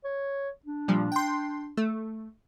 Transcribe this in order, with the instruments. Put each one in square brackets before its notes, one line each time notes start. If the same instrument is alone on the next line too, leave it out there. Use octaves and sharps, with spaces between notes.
[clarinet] C#5
D4
[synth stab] A#2 F3 G3
G5 C6
A3